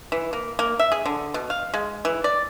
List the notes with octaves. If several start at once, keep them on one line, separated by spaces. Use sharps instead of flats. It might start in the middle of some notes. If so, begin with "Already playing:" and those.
E3
A#3
A#3
E5
G#4
D3
B2
F5
G#3
E3
D5